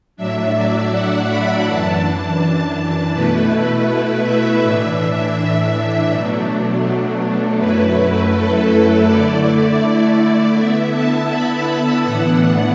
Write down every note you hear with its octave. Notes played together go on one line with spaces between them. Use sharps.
A2 F#3 D4 E5
D5
F#5
B5
F#2 E3 D4 A5
B2 A3 E4 B4
B4
E5
A2 E3 D4
B2 F#3 A3 D4
F#2 F#3 A3 E4 B4
A4
D3 A3 E4 D5
D3 B3 E4 E5
A5
B5
A5
A2 E3 B3 D4 F#5